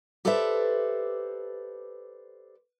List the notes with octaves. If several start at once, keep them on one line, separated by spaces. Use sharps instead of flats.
G4 A4 B4 C5 D5 E5